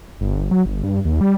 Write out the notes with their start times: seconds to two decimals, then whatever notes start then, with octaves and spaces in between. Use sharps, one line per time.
0.21 G1
0.51 F#3
0.66 G1
0.84 G2
1.05 D#2
1.21 G3